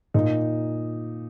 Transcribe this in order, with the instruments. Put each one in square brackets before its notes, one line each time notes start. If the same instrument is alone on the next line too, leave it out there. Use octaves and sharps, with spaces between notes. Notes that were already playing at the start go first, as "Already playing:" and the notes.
[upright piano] A#2 D#4